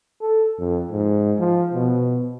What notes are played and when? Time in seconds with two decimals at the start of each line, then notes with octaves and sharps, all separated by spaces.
0.21 A4
0.59 F2
0.91 G#2
1.39 F3
1.74 B2